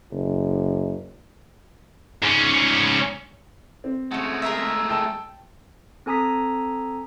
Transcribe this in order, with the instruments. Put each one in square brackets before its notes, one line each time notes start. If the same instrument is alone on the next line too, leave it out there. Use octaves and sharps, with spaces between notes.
[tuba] F#1
[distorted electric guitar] G#2 C#4
[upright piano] C4
[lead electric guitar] G#3 A3 [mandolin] C#4 F#4
[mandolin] G#4 A#4 E5
[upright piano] G5 A5 E6
[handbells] C4 A4 G#5 A#5 D#6 B6